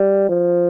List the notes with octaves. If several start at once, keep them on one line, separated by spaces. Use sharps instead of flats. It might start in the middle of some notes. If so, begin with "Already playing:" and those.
Already playing: G3
F3